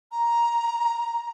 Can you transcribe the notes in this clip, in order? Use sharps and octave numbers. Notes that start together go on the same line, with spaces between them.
A#5